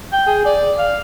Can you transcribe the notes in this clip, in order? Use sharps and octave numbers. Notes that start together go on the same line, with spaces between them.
G5
G#4
D5
F5